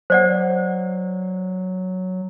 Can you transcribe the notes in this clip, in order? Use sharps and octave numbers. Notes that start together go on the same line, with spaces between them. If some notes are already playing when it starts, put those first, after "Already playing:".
F#3 C5 D5 F#5